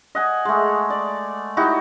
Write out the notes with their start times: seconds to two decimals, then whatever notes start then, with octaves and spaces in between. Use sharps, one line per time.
0.15 D#5 F#5 G#5
0.45 G#3 A3
0.90 D5
1.57 D#4 E4 F#4 G4